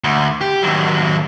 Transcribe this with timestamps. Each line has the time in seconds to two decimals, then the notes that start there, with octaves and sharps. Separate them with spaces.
0.04 D2
0.41 G4
0.63 D#2 F#3